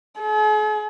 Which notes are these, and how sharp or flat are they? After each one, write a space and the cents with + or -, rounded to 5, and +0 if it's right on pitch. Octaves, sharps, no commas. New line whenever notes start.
G#4 +45